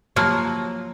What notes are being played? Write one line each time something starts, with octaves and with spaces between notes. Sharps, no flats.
F3 F#3 A#3